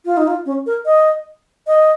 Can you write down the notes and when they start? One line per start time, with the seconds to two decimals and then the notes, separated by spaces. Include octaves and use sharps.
0.05 F4
0.17 D#4
0.28 F4
0.46 C#4
0.66 A#4
0.86 D#5
1.67 D#5